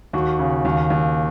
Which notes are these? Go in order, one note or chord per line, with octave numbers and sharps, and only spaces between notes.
D#2 F#4
C#3
D#2
D#2